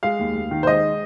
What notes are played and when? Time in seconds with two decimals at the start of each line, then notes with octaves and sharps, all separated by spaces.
0.03 G#3 F5
0.19 D#2
0.35 D#2
0.51 D#3
0.63 C5
0.67 G#3 D#5